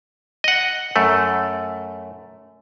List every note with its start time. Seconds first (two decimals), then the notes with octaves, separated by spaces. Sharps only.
0.44 D#5 F#5
0.96 F#2 A3